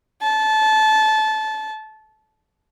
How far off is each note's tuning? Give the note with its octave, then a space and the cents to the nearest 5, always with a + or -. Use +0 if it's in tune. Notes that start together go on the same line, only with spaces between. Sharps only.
A5 -20